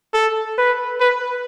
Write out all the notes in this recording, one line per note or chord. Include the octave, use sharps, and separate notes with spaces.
A4
B4
B4